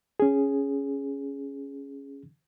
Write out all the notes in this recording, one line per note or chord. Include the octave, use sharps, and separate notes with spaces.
C#4 G#4